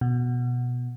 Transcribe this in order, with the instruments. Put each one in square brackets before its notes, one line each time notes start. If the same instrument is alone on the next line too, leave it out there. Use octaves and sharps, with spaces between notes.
[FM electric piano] B2